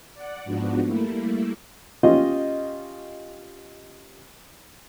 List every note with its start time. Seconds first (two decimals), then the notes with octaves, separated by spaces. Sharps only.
0.14 D5 F#5
0.44 G#2 F3 B3 D4 F#4
0.86 G3 A3 A#3 E4
2.03 C#4 F4 G4 D#5